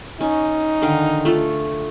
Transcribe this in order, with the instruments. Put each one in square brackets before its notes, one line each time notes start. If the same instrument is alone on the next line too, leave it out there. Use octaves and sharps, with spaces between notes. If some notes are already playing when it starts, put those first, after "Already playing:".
[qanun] C#4 [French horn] D#4
[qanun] D3 D#3 F5
A3 F4 A4